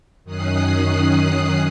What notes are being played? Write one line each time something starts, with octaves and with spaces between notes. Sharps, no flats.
F#2 D#3 C#4 D#6 F#6 C7